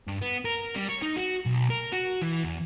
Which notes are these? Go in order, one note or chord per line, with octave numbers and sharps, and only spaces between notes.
G2
B3
A#4
G3
C#5
D#4
F#4
B1
A#4
F#4
E3
E2